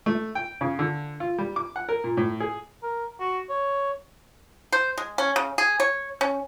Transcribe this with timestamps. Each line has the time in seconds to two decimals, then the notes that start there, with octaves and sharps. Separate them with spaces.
0.06 A3
0.35 G5
0.61 C#3
0.79 D3
1.20 F4
1.38 G3
1.56 D6
1.76 F#5
1.89 A#4
2.04 A#2
2.17 A2
2.40 G#4
2.83 A#4
3.20 F#4
3.49 C#5
4.72 C5
4.98 G#3
5.18 C#4
5.36 C#3
5.58 G#4
5.80 C#5
6.21 C#4